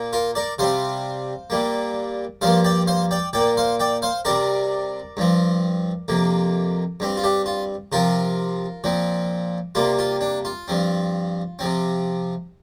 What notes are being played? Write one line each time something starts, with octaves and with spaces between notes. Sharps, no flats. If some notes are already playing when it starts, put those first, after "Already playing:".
Already playing: A#2 A#3
F4 A#4
A#4 D5
C3 G3 C4 C5 F5
A#2 G3 A#3
G2 F3 A#3 C5 F5
D5 G5
C5 F5
D5 G5
A#2 D5 G5
A#3
C5 F5
D5 G5
C5 F5
C3 G3 C4 A#4 D5
G2 F3 C4
F2 C3 A#3
G2 G3 C4
F4
D4 G4
F4
C3 F3 C4 F4 A#4
A#2 F3 C4
C3 G3 A#3 F4
F4
D4
F4
G2 F3 C4
C3 F3 C4